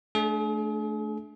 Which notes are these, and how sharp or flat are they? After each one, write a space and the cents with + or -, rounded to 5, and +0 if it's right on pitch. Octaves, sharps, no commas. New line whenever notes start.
A3 -15 D4 +0 G#4 +40